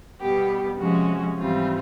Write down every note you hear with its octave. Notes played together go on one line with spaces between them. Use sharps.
B2 G3 B3 G4
C3 F3 G#3 C#4 F#4
G#2 E3 G3 C4 F4